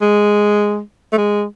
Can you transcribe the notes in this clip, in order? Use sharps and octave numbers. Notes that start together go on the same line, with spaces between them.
G#3
A3
G#3